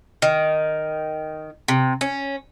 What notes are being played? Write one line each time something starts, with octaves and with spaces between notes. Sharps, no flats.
D#3
C3
C#4